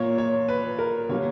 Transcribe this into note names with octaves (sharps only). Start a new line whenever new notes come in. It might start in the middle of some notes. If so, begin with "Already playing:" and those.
Already playing: A#2 A#3 C#5
C#5
B4
A#4
D3 G3 A#3 C#5